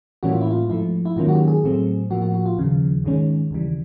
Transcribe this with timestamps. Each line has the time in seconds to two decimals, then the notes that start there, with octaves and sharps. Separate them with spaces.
0.23 A2 E3 G3 A#3 C#4 F#4
0.32 F4
0.41 E4
0.51 F4
0.69 G#2 F3 A3 E4
1.05 E4
1.16 G#2 D#3 F#3 A#3 C#4 F4
1.29 F#4
1.33 G4
1.48 G#4
1.64 A2 F#3 A3 C4
2.10 A2 F3 A#3 F#4
2.22 F#4
2.34 F#4
2.46 F4
2.58 D#2 C#3 F3
3.04 G#2 D#3 G#3 C#4
3.51 D#2 C#3 E3 G3